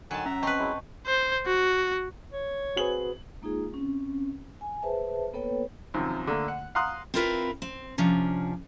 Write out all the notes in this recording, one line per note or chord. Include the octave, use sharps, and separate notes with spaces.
D3 D#3 F#3 G#5 A5
C#4 E5 A#5
C4 B4 D#5 A5 C#6
F#3 G#3 E4
C5
F#4
C#5
C4 F#4 G#4 B4 F#7
G#3 A#3 D#4 F4 G#4
C4 C#4
G#5
G#4 B4 C5 E5 A5
A#3 B3 A4 B4 C#5 G5
F#2 C3 D#3 F3
D3 A3 A#3
F#5
F5 F#5 A#5 C6 D#6 F#6
C4 E4 F4 A#4 B4
C4
C3 F3 C#4 D4